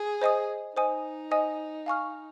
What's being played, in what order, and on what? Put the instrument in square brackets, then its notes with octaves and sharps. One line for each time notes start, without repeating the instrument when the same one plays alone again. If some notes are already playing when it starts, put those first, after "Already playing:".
Already playing: [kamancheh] G#4
[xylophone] C5 D#5 G#5 D#6
[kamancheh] D#4 [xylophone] C5 D#5 G#5 D#6
[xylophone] C5 D#5 G#5 D#6
F5 G#5 C#6 F6